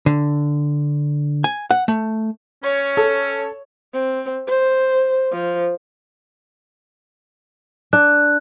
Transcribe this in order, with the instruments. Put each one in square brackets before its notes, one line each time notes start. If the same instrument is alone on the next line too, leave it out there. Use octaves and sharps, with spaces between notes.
[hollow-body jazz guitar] D3
G#5
F#5
A3
[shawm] C#4 [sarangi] C#5
[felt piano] A4
[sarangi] C4
C5
F3
[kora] D4 [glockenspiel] F#6